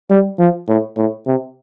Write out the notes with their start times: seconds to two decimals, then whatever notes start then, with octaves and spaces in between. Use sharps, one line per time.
0.10 G3
0.39 F3
0.69 A2
0.97 A2
1.27 C3